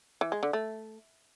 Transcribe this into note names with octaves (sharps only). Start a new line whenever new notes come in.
E3
G#3
D3
A3